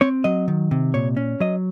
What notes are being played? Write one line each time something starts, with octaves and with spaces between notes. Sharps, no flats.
C4 C#5
F#3 D#5
D#3
C3
A#2 C#5
C#4
F#3 D#5